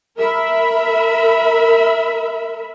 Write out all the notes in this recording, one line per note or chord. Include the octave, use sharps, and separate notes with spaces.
A#4 E5 B5